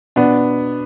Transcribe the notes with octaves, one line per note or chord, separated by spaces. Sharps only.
B2 B3 D4